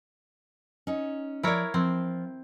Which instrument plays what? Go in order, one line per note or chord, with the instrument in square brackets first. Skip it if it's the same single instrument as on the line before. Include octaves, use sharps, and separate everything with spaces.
[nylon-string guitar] C#4 D#4
[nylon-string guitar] F3 D5 [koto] E4 A#4 C#5
[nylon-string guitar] F3 [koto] C4